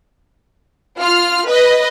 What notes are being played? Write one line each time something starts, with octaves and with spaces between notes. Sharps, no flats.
F4 F6
B4 D#5